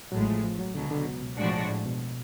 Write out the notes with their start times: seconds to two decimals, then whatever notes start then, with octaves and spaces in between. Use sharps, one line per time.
0.12 A1 A2 F#3 G#3
0.28 F3
0.44 F3
0.59 F#3
0.75 C#2 B2 D3 F#3
0.91 D3
1.22 B2
1.37 A2 F3 G#3 D4 F#4
1.70 A2
1.86 B2